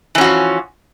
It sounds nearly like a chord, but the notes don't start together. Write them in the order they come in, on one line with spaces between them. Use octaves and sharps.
E3 C#4 F#4 F3